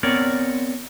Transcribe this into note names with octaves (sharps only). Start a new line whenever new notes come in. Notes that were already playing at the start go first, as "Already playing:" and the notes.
B3 C4 A#4 C#5 D5